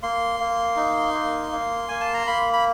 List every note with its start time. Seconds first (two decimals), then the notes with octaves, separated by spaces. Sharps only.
0.03 A#3 C6
0.40 A#3
0.76 D#4
1.14 A#3
1.52 A#3
1.89 A#3 G#5
2.01 A5
2.14 A#5
2.27 A#3 B5
2.53 B5